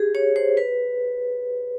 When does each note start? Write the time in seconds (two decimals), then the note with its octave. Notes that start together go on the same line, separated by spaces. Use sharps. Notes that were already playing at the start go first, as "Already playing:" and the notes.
Already playing: G4 G#4
0.15 C#5
0.36 C5
0.57 B4